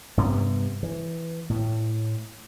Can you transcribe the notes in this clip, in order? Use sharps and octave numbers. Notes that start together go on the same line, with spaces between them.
G2 C3 B3
E3
A2